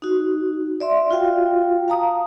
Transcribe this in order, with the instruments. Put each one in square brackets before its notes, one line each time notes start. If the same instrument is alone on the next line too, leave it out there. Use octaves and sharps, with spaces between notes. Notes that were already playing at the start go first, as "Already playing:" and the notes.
[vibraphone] D#4 F#4
D5 E5 C6
F4 F#4 F5 G5
F5 A5 A#5 D#6